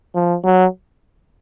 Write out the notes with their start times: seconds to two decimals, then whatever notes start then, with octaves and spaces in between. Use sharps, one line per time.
0.15 F3
0.44 F#3